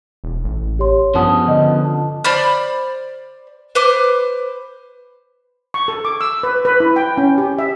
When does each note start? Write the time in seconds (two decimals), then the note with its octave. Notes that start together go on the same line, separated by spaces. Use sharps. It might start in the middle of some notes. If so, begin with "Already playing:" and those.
0.24 E1
0.45 A1
0.79 G4 C#5 C6
1.15 G2 F3 B3 C#4 F#5 A5 D#6
1.48 D3 D#5
1.85 A5
2.24 C5 D5 B5 F6
3.75 B4 C5 D6
5.74 C#6
5.88 A4
6.05 D6
6.21 E6
6.43 B4
6.65 B4
6.80 E4
6.96 G5
7.17 C#4
7.38 G4
7.59 E5